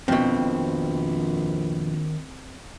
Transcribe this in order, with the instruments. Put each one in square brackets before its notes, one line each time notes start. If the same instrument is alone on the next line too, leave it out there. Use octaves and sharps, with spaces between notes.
[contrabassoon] A#1 [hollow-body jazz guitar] F2 B2 [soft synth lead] D#3 [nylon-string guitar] C4